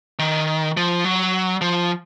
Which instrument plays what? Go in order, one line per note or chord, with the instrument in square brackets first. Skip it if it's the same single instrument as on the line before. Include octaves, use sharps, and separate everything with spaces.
[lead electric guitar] D#3
F3
F#3
F3